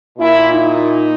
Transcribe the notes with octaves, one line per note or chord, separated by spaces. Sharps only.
A#2 E4
D#4